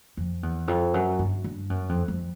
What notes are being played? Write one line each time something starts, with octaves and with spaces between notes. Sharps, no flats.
F2
E2
F2
F#2
G2
G2
F#2
F2
F2